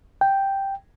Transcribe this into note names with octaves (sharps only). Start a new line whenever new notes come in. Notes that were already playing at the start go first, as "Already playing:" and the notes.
G5